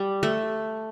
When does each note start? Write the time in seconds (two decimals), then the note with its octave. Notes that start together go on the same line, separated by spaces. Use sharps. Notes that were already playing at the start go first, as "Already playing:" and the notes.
Already playing: G3
0.23 A3